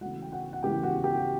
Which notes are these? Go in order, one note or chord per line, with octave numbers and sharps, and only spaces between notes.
C#3 E3 A3 F#4 F#5
G5
F#4 F#5
F#5
C#3 E3 A3 G4 G5
F#4 F#5
G4 G5